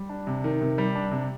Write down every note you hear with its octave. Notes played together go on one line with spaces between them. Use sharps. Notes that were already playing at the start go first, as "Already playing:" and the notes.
Already playing: G3
D4
C3
D#3
C3
G3
D4
C3